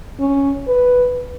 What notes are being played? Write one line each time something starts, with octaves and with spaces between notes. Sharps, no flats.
C#4
B4